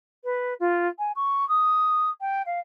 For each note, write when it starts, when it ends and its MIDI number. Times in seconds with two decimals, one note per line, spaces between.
0.24 0.54 71
0.60 0.88 65
0.98 1.12 80
1.16 1.47 85
1.49 2.10 87
2.21 2.42 79
2.46 2.59 77